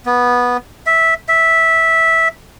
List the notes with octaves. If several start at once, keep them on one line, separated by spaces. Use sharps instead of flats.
B3
E5
E5